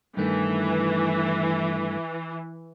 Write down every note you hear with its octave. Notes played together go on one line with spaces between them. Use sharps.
G2 D#3 E3 A3